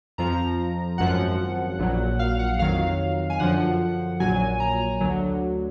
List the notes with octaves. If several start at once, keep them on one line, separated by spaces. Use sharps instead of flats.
F2 F3 A#5
G#1 F#2 F3 F#5
A#1 A#2 F#3
F5
F#5
F2 D#3 F#3 F5
G#5
F#2 D3 F3 F#5
A#1 A#2 F#3 G#5
A#5
D2 D3 F#3